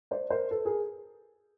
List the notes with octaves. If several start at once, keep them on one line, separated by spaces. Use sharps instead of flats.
C5 D5
A#4 C5
A4 B4
G#4 A#4